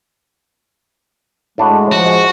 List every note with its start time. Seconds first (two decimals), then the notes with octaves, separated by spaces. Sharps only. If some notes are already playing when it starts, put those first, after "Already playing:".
1.58 A2 G#3 D4 F#4
1.92 F3 F#4
2.06 G#3